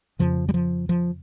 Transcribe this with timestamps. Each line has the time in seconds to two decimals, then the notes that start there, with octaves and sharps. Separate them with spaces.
0.19 F2 C#3 F3
0.49 G3
0.54 F3
0.89 F3